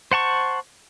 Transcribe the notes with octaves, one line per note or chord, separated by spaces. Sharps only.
C5 F#5 A5 C#6